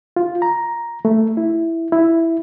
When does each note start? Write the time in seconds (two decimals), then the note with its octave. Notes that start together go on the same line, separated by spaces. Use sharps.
0.16 F4
0.42 A#5
1.05 A3
1.37 E4
1.92 E4